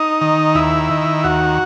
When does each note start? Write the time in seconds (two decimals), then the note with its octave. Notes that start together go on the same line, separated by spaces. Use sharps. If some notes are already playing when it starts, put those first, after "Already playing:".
Already playing: D#4
0.21 D#3
0.55 D#2 E4
0.90 D#3
1.24 D#2 F#4